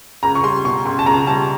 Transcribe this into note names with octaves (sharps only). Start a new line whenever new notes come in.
C#2 A#5
C#6
G3 C6
B2 C#6
C#2 C6
A5
C#2 A#5
G3 A5